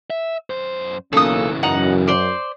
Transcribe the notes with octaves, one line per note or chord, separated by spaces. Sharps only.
E5
F#2 C5
B1 C#3 E3 A#3 C#4 A4 D#6
F#2 D#4 F#5
C5 D5